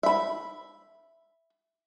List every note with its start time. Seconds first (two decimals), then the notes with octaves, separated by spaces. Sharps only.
0.03 E5 B5